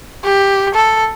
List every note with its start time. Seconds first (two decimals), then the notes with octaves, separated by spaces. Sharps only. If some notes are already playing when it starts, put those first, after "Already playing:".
0.24 G4
0.75 A4